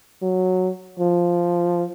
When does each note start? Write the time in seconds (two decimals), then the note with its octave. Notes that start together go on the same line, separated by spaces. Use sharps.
0.22 F#3
0.99 F3